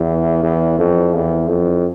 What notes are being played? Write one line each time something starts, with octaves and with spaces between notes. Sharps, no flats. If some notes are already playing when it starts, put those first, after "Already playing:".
Already playing: E2
E2
F2
E2
F2